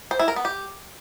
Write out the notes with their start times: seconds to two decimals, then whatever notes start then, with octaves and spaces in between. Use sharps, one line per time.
0.11 C5
0.19 E4
0.28 A#4
0.36 B3
0.45 G4